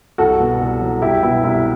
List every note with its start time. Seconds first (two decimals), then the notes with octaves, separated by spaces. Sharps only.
0.18 C2 F#4 A4
0.40 B2
0.61 C2
0.81 F#3
1.02 C2 E4 G4
1.23 B2 E4
1.44 C2 E4